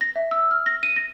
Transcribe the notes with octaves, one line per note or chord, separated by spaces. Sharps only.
A#6
E5
E6
F6
A#6
D#7
A#6